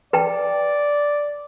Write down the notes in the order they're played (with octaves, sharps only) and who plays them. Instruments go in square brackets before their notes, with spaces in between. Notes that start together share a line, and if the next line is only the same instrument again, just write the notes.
[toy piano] B4 G5 A5 [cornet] D5